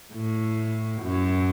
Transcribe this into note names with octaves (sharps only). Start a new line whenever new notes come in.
A2
F#2